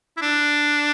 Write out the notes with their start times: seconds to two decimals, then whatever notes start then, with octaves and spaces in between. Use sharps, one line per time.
0.17 E4
0.21 D4